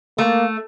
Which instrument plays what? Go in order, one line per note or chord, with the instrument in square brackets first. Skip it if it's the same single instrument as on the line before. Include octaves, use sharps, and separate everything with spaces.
[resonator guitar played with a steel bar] A3 [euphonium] A#3